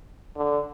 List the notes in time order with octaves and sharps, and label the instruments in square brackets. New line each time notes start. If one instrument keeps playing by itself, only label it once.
[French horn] D3